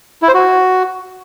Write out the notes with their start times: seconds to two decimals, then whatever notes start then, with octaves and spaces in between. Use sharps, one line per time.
0.22 E4
0.28 C5
0.34 F#4